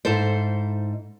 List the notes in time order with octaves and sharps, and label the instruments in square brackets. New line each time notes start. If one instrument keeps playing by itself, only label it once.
[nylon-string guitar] G#2 D#4 E4 A4 C5